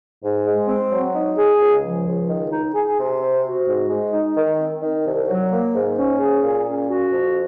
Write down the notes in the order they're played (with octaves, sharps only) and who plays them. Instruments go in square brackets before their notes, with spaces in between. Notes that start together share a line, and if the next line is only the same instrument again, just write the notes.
[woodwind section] G#2
G#3
C4
F#3
D#4
G#4
C#2
F3
C#2
D#3
D#4
G#4
C3
C4
F#4
G#2
G#3
D#4
D#3
C4
D#3
C2
F#3
A#3
G#2
C#4
G#4
A#2
C#4
F#4
F2